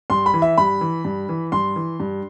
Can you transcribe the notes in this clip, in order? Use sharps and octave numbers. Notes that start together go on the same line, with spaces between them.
G2 C6
B5
E3
E5
G2 B5
E3
G2
E3
G2 C6
E3
G2